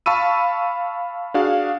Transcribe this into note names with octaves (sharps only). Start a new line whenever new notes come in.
F5 A5 B5 C#6 E6 D#7
D4 F#4 G#4 F5